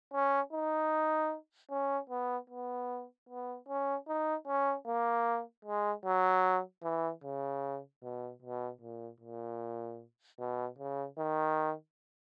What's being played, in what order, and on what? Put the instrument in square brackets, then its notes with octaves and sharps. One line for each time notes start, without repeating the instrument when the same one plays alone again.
[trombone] C#4
D#4
C#4
B3
B3
B3
C#4
D#4
C#4
A#3
G#3
F#3
E3
C#3
B2
B2
A#2
A#2
B2
C#3
D#3